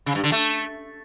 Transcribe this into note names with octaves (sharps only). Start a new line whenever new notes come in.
C#3
G2
D3
A3